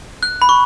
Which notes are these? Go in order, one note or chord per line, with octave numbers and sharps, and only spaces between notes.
F#6
B5
C#6